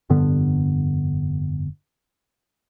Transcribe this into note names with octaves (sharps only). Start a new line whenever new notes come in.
F1 G2 D3 B3